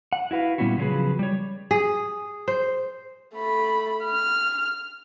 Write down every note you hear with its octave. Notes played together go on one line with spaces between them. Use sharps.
F#5
E4 F#4 B4 F5
A#2 G3 B3 C#4 E4 F#4
C#3 F3 F#3 C#4 G#4 B4
G3 C#5
G#4
C5
A3 B5
F6